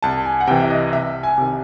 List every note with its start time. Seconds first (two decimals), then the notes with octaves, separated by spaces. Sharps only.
0.02 C2 A5
0.25 G#5
0.40 F#5
0.47 C3 E3 G5
0.61 E5
0.70 D#5
0.93 C2 E5
1.23 G#5
1.38 C3 D#3